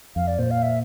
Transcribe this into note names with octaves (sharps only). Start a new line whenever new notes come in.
F2 F5
D5
A#2 C5
F5
E5